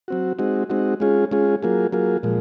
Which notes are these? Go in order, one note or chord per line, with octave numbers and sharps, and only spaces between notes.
F#3 C4 F#4
G#3 C4 D#4 F#4
G#3 C4 D#4 F#4
G#3 C#4 F4 G#4
G#3 C#4 F4 G#4
F#3 A#3 F4 G#4
F#3 A#3 F4 G#4
A#2 F3 G#3